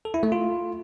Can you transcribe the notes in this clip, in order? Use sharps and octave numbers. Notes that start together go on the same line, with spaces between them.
A4
E4
A3
F4